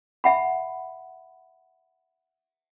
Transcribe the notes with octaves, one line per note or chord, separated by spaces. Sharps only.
E5 F#5 B5